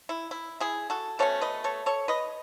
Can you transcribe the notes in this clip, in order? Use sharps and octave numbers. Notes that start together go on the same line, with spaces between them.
E4
E4
E4 G#4
F#4 A4
B2 A3 C#4 A4 C#5
B4 D#5
A4 C#5
A4 C#5
B4 D#5